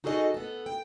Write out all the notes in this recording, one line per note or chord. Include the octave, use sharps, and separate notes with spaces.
D#4 F#4 G#4 A4 C#5 D#5
B3 A4
G5